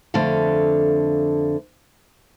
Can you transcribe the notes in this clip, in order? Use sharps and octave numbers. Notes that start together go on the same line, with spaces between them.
F2 D3 A3 A4 F5